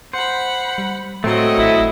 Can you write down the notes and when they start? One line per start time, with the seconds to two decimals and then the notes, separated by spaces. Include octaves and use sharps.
0.13 C5 F#5 B5
0.78 G3
1.24 A2 F#3 A3 C4 D#5
1.58 G#1 E4